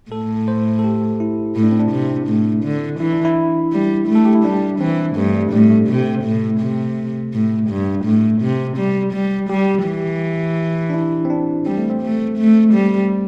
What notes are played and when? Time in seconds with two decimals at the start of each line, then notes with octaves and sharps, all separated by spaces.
0.11 A2 A4
0.48 C5
0.79 A4
0.84 G4
1.20 E4
1.56 A2 E4
1.63 D4
1.71 C4
1.80 D4
1.92 C3
2.28 A2
2.64 D3
3.00 E3 E4
3.13 D4
3.25 E4
3.72 G3
4.08 A3
4.15 A4
4.25 G4
4.35 E4
4.44 G3 D4
4.80 E3 C4
5.16 G2 A3
5.35 G3
5.53 A2 G3
5.70 A3
5.89 C3
6.25 A2
6.61 C3
7.34 A2
7.70 G2
8.05 A2
8.42 C3
8.78 G3
9.14 G3
9.50 G3 G4
9.86 E3
10.90 D4
10.94 E4
11.25 C4
11.30 D4
11.66 G3 C4
11.78 A3
11.89 C4
12.02 A3
12.39 A3
12.74 G3